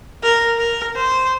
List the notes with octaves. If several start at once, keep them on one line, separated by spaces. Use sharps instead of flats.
A#4
A#4
C5